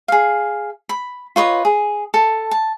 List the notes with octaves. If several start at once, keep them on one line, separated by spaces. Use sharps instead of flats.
G#4 F5
B5
F4 B4 C#5 D#5
G#4
A4 A5
A5